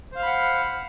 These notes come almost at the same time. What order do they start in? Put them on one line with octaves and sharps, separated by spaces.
C5 F5 F6 B5 F#5